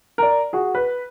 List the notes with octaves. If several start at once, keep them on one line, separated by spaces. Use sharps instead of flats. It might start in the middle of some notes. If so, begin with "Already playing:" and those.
A#4 D5
F#4 G#4
B4